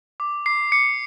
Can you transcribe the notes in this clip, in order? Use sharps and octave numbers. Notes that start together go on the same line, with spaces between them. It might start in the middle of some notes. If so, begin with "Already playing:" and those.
D6
D6 C7
D6 C#7